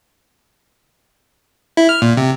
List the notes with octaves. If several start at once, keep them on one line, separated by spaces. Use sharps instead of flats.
E4
F6
A#2
C3